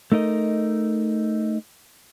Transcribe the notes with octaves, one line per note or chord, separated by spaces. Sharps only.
A3 D#4 A#4 D#5